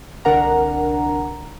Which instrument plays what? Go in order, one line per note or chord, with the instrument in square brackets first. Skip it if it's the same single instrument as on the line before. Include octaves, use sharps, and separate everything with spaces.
[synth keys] C2 D3 D4 A#4 F#5 A#5